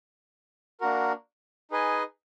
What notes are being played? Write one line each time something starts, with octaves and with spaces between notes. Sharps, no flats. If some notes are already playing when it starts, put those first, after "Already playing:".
A#3 D4 F#4 A#4
D#4 G#4 B4 D#5 G#5